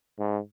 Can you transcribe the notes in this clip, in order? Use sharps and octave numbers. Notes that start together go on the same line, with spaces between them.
G#2